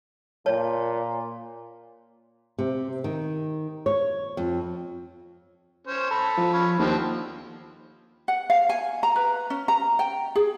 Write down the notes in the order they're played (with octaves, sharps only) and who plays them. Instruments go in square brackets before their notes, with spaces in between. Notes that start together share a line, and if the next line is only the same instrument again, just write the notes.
[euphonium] A#2 [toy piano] C#5 A5
[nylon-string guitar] C3
D#3
C#5
F2
[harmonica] C#4 C5
A4 B5
[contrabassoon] F3
[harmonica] C#4 B5
[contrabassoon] D#2 [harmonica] D3 F3 C4
[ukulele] F#5
F5
G#5
A#5
B4
C#4
A#5
G5
G#4